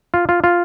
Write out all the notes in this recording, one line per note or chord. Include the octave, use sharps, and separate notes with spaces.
F4
F4
F4